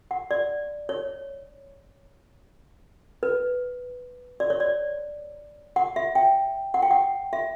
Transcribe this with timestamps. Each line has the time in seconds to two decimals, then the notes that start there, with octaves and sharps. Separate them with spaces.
0.11 F#5
0.31 D5
0.89 C#5
3.23 B4
4.40 D5
4.50 C#5
4.60 D5
5.76 F#5
5.96 E5
6.15 G5
6.74 F#5
6.82 G5
6.91 F#5
7.33 E5